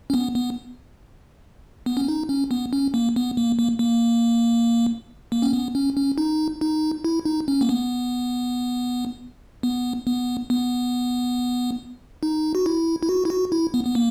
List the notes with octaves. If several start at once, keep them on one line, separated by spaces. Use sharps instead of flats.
C#4
B3
B3
B3
C#4
D#4
C#4
B3
C#4
A#3
B3
A#3
A#3
A#3
A#3
C#4
B3
C#4
C#4
D#4
D#4
E4
D#4
C#4
A#3
B3
B3
B3
B3
D#4
F#4
E4
E4
F#4
E4
F#4
E4
B3
B3
A#3